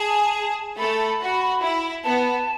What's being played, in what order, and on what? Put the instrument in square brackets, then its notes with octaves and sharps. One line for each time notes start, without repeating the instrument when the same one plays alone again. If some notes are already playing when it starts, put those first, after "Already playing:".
Already playing: [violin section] G#4 [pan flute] A5
[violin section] A3 A4 [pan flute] B5
[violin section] F#4
E4
[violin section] B3 [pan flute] A5